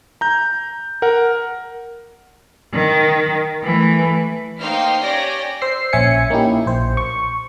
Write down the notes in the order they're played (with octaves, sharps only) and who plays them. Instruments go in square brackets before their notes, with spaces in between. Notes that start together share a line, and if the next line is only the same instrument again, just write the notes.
[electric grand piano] A#5 G6
A#4 F#5
[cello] D#3
E3 A3
[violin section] A#3 D#4 C5 F5 G5 F6
C#4 G4 C#5 D5 A#6 D7
[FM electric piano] C5 E6 C7
A#1 C#4 E5 G#5 C#7
A#3 C#4 D#4 E4 G4
A#1 C5
C#6